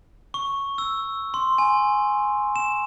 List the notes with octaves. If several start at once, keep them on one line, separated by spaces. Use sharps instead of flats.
C#6
E6
C6
G#5
E7